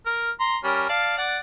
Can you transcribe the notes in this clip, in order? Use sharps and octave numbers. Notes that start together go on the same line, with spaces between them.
A#4
A#5 C6
G3 C#4 A#4
D5 F5 A5
D5 F#5